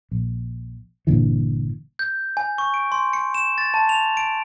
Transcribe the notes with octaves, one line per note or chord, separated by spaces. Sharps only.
A#1
G1 A#2 D3 E3
G6
G#5
C#6
D7
C6
C#7
E7
A6
A5
F7
D7